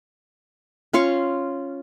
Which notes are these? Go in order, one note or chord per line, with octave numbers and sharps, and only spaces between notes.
C#4 F4 F5 C#6